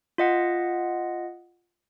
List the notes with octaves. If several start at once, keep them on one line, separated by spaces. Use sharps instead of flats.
F4 D#5 F#5